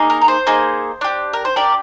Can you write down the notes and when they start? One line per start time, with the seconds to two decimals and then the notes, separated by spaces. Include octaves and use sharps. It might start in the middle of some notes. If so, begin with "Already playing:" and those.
Already playing: A#3 D#4 G#4
0.10 A#4
0.21 A#4
0.28 C5
0.47 A#3 D#4 G#4
1.01 D4 G4
1.33 A#4
1.45 C5
1.56 D4 G4 A#4 D5